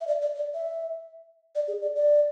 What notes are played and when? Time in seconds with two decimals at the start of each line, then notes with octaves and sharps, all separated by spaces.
0.01 E5
0.07 D5
0.22 D5
0.35 D5
0.54 E5
1.55 D5
1.68 G#4
1.82 D5
1.96 D5